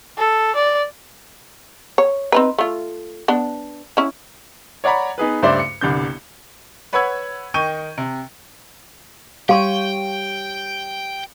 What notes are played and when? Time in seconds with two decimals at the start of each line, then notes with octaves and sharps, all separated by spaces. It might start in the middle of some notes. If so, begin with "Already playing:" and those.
0.18 A4
0.55 D5
1.98 C#5
2.32 C4 D#4 B4
2.58 A3 F4
3.28 B3 D4
3.97 C#4 E4
4.84 C#5 D5 F#5 A#5 B5
5.18 B3 D#4 G#4 B4
5.42 C#2 G2 A3 C5 D5 E5
5.60 C#7
5.81 G1 C2 D4 G6
6.93 B4 C#5 F#5 B5 E6 G#6
7.54 D#3 D#4 G5 C#6 G6 D#7
7.98 C3
9.49 G3 G4 C#5 F5 G5 C6 C#6 D#7